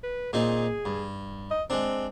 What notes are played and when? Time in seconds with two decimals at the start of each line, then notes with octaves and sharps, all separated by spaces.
0.03 B4
0.33 A#2 C4 D#4 G#4
0.85 G2
1.51 D#5
1.70 G#3 C4 D4